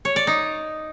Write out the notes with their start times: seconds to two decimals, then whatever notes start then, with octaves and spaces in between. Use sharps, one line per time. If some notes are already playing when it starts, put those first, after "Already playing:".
0.05 C#5
0.16 D5
0.27 D#4